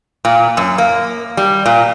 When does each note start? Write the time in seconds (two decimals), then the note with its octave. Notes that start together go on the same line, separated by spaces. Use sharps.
0.25 A#2
0.57 F#2
0.78 A#3
1.37 G3
1.66 A#2